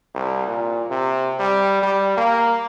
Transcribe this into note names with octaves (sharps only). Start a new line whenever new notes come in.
C2
A#2
C3
G3
G3
A#3